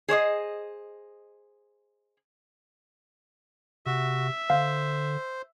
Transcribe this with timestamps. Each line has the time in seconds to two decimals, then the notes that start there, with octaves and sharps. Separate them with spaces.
0.08 G#4 C5 C#5 D#5
3.86 C3 F#4 E5
4.50 D3 C5 F5